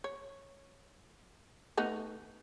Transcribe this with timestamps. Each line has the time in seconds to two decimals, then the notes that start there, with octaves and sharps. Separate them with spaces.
0.04 C#5
1.77 A3 B3 D#4